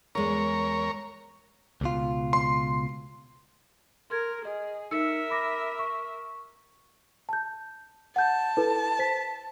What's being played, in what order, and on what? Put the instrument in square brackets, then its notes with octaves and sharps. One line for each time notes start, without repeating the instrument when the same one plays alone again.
[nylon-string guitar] E2 G#3 [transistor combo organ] A#4 C#5
[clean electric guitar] C#2 B2 F4
[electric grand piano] C6
[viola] A#4 [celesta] C6 G#6
[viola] G#4 [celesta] D#5
[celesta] D#4 E6 C#7 [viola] A#4 E5
[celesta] B5 D6 A#6
C#6
A5 G6
[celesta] F#5 G6 [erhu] A5
[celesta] E4 A4 B4
C5 B6